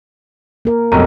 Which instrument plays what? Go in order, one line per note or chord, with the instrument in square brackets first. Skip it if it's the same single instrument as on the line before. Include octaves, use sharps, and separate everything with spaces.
[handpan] A#3 A#4
[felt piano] F1 B1 [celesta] A#5